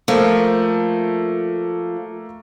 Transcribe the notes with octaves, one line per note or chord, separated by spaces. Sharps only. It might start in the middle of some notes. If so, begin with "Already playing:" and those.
F3 A3 A#3